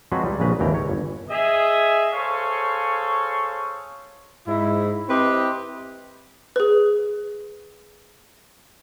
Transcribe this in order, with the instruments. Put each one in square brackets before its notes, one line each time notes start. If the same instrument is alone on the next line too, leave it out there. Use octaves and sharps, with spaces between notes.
[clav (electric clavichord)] F3 F#3 G#3 C4 F#4 B4
C#2 G3
A#1 C#3 B4 A#5
G#1 D#2 E3 G5 A#5
C#2 C#5
G1
[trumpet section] G#4 D#5 E5
G#4 A4 C5 C#5 F5 C#6
[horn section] G#2 E4
C4 E4 G4 B4 C5 D#5
[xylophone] G#4 B4